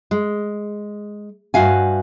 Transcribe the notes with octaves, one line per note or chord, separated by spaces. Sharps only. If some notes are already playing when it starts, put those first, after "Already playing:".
G#3
G2 A#2 F#4 E5 F5 G#5